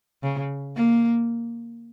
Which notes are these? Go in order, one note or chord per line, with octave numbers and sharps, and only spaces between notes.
C#3
A#3